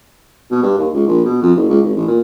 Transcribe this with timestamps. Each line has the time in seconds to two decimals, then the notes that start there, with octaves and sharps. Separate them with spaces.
0.51 B2
0.63 G2
0.78 D#2
0.94 C#2
1.07 A#1
1.25 B2
1.42 F2
1.55 F#1
1.70 C#2
1.83 G#1
1.96 A1
2.07 A#2